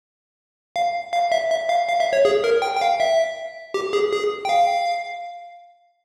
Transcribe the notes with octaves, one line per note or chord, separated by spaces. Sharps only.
F5
F5
E5
E5
F5
F5
E5
C#5
G#4
A#4
G5
G5
F5
E5
G4
G#4
G#4
G5
F5